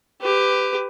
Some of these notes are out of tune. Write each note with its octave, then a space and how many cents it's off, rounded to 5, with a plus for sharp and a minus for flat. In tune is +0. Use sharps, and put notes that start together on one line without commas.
G4 +10 B4 +25